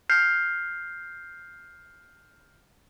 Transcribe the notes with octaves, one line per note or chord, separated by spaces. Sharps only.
F6 G6 C7